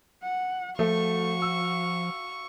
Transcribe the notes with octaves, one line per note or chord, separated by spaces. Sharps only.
F#5
F3 A3 F#4 F5 C#6
E6